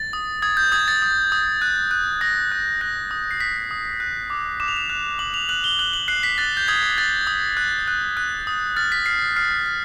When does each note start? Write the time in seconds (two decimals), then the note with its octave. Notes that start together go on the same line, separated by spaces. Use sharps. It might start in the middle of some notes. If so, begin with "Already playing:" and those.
Already playing: A6
0.13 D#6
0.42 D#6 G#6
0.57 G6
0.72 D#6 G#6
0.88 A6
1.02 D#6
1.32 D#6
1.62 F#6
1.91 F#6
2.21 D#6 A#6
2.52 F#6
2.81 F#6 A#6
3.11 D#6
3.31 C7
3.40 D#6 B6
3.71 D#6
4.00 F#6
4.30 D6
4.60 D6 E7
4.68 F7
4.77 E7
4.89 F#6
5.19 D6 F#7
5.34 F7
5.49 F#6 F#7
5.64 G7
5.79 F#6 F#7
5.93 F#7
6.08 F#6 C7
6.23 B6
6.38 F#6 A6
6.57 G6
6.68 D#6 G#6
6.98 F#6 A6
7.27 D#6
7.57 F#6
7.88 F#6
8.17 F#6
8.47 D#6
8.76 F6 A6
8.92 B6
9.06 F6 C7
9.36 F6 C7
9.66 F6